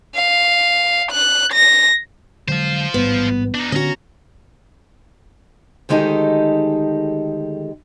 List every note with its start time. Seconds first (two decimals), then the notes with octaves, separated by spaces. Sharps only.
0.15 F5
1.12 F#6
1.53 A#6
2.48 D3 F#3 G#3 F4 C5
2.94 A1 G#2 G3 B3
3.55 D4 D#4
3.72 D3 C#4 F#4 D#5 A#5
5.89 D2 D#3 G#3 D#4 G4 A4